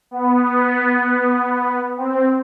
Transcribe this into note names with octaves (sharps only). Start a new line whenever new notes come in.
B3
C4